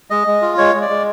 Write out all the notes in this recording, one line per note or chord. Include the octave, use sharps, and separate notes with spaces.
G#3 D#5
G#3
F4
G#3 C#5
G#3
D5
G#3